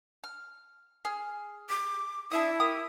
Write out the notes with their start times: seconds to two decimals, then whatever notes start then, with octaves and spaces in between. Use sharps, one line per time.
0.24 F6
1.05 G#4 F6
1.69 D6
2.32 D4 E4 E5 D#6
2.60 A#3 G4 D#6